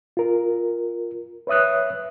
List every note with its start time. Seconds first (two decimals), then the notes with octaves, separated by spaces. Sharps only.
0.17 F4 A#4
1.47 B4 C#5 E5 D#6 F#6